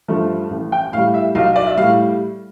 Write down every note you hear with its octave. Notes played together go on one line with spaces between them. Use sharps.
G2 F3 A3
A1
G5
A2 F5
G3
E5
B1 F5
D5
E5
A2 G3 F5